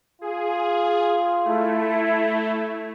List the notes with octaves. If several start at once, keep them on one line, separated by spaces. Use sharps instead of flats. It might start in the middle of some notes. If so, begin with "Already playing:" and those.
F4 G#4
A3 E4